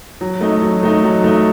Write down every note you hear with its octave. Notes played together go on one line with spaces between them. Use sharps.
F#3
A3 D#4
F#3
A3 D#4
F#3
A3 D#4